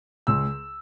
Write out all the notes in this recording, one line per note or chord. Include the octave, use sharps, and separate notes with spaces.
C#2 E6